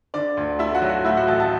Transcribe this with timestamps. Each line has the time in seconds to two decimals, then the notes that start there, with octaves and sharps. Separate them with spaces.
0.14 D3 D5
0.37 D2
0.59 A3 E4 E5
0.75 F#4 F#5
0.82 F#3
0.89 F#4 F#5
1.05 A2 E4 E5
1.17 F#4 F#5
1.27 A1 A4 A5
1.39 A4 A5